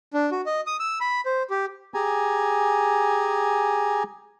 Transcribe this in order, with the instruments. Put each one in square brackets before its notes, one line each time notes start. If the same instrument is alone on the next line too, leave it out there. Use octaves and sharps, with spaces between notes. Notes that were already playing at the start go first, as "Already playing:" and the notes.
[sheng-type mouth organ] D4
F#4
D#5
D#6
E6
B5
C5
G4
[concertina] G4 G#4 G#5 A#5